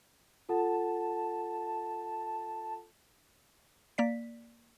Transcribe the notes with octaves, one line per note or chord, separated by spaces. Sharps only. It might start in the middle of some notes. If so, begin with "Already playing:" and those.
F4 A4 F#5 A5
A#3 D5 B6